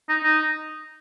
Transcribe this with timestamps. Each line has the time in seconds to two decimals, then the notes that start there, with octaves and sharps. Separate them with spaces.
0.09 D#4
0.23 D#4